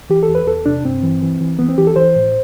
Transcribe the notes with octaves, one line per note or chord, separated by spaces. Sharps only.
E3 G4
A4
E2
B4
E2 A4
C3 D4
G2 C4
E3
E3
E3
E3 B3
C4
E3 G4
A4
E3 C5
A2